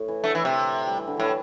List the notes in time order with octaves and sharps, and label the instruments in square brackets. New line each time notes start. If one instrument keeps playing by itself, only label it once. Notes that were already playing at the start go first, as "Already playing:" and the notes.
Already playing: [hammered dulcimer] A2
E3
[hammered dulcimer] D3 [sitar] A3
[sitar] E3
C3
[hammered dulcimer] G3
E3
D3
[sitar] A2 [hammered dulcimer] E3